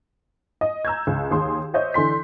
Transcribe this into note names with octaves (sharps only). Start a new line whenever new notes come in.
D#5
A#5 E6 G6 G#6
C#2
D#2 G#4 C6
C5 C#5 D#5 E5 G6
D3 E3 C6 B6